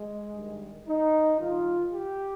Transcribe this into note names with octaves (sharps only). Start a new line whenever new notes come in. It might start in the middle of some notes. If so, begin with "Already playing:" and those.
Already playing: G#3
G2 D#3
D#4
G2 D#3 F4
G4